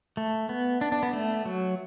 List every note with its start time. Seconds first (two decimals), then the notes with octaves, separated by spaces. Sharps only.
0.17 A3
0.49 B3
0.81 D4
0.92 D4
1.03 B3
1.13 A3
1.45 F#3